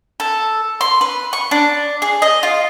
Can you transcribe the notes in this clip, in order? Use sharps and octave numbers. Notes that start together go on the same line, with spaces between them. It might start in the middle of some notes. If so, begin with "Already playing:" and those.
A4
C6
B4
C#6
D4
G#4
D#5
F4